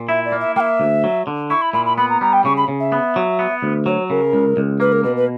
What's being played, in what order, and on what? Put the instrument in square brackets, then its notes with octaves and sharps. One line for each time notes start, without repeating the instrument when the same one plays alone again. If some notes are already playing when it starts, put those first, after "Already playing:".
Already playing: [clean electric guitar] A#2
[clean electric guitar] E4 [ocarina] E5
[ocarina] D5
[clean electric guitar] A#3
[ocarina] E5
[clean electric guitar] A#3 [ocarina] E5 G5
[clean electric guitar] D2
F#3
D3
[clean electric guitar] E4 [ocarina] C#6
[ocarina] B5
[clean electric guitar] A#2 [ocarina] B5
[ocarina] B5
[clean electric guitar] B3 [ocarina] B5
[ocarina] A#5
[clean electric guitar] G3 [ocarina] A#5
[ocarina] G5
[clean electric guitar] C#3 [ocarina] C#6
[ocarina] B5
[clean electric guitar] C#3
[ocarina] E5
[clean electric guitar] B3
F#3
B3
D2
[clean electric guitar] F#3 [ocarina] C#5
[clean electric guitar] C#3 [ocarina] A#4
[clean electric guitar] C#2
C#2
[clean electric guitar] A#3 [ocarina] B4
[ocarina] A#4
[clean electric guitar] B2 [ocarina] B4
[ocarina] B4